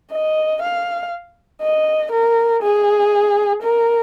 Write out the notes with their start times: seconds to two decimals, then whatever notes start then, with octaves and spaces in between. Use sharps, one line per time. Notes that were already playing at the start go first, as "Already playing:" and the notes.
0.12 D#5
0.62 F5
1.62 D#5
2.11 A#4
2.63 G#4
3.62 A#4